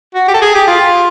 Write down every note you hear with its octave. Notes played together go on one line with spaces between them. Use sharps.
F#4
G4
A4
G#4
G4
F4